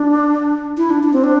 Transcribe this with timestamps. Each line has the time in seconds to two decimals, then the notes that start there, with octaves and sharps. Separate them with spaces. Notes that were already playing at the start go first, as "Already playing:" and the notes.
Already playing: D4
0.77 E4
0.90 D4
1.03 D4
1.13 C4
1.24 D4